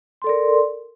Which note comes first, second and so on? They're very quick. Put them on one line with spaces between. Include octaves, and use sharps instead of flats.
C6 A4 D5 A#4